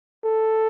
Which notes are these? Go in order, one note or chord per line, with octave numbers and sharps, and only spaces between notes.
A4